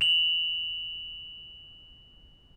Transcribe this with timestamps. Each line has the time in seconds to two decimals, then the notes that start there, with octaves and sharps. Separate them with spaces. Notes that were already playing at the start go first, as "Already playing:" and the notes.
0.01 F7 F#7